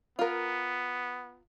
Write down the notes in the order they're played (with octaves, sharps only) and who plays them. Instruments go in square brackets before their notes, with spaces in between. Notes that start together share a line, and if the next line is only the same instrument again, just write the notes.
[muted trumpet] B3 [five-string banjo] F4 A#4